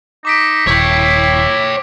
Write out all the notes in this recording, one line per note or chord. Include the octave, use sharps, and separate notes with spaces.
D#4 D6 B6 D7
D#1 E4 C#5 G5